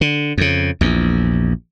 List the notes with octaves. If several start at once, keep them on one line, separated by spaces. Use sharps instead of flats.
D3
F2 C#3
A#1 E2